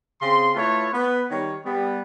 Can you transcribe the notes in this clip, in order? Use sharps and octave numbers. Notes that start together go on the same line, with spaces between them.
C#3 C4 C6
A3 E4 F4 B4 C#5
B3 B4
D#3 G3 C#5
G3 B3